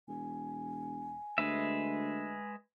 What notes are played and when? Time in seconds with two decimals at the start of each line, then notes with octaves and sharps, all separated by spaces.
0.08 E1 G#5
1.38 D2 G#3 B4 E5